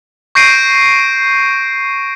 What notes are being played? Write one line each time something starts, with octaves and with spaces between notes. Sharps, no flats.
C#6 G6 A#6 C7 D7 D#7